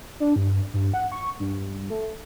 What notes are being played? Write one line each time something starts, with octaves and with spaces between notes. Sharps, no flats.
D4
G2
G2
F#5
C#6
G2
A3